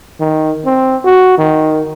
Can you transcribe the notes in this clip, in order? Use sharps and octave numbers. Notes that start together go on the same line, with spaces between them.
D#3
C4
F#4
D#3